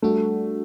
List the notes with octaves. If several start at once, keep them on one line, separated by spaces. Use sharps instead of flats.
G3 A3 D4 F#4